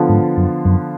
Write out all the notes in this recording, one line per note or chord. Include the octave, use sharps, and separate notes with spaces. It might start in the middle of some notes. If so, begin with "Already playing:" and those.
Already playing: D3 F3 B3 F4
G#2
F#2
F#2